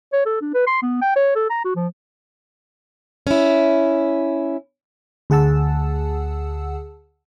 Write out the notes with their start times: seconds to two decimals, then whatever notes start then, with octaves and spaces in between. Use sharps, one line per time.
0.13 C#5
0.26 A4
0.41 D4
0.54 B4
0.67 C6
0.83 B3
1.02 G5
1.16 C#5
1.36 A4
1.50 A#5
1.65 F#4
1.76 F3
3.27 C#4 E4
5.30 D2 G#4 F#5 A5 E6